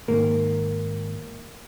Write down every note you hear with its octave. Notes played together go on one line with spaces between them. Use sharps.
G#2 D#3 A#3 A#4